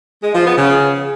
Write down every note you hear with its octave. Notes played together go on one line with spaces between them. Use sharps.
G#3
F3
B3
C#3